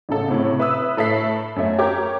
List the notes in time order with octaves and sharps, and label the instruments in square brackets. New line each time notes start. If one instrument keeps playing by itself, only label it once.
[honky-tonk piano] A1 C#3 A4
A2 C3
B4 E5 D#6 E6
A2 A4 E5 B6 C7
F#2 A3
G4 A#4 C#5 A#5 D6 G6